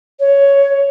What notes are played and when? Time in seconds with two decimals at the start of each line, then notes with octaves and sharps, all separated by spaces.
0.19 C#5